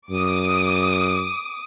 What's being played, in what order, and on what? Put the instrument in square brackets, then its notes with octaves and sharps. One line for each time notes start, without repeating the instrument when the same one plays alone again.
[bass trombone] F#2 [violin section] D6 D#6